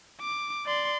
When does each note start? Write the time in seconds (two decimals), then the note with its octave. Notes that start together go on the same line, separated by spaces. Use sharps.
0.21 D6
0.66 D5 C6